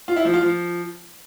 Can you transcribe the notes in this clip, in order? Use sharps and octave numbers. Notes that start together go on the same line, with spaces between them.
F4
E4
F3
F4
F3